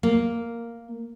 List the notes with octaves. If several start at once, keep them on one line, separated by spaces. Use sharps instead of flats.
A#3